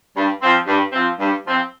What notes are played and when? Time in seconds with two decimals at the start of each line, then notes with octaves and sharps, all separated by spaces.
0.15 G2
0.41 F3 C4
0.67 G2
0.93 F3 C4
1.19 G2
1.45 F3 C4